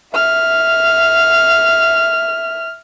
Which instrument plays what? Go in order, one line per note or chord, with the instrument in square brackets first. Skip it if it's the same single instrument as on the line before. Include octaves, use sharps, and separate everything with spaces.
[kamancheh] E5 F6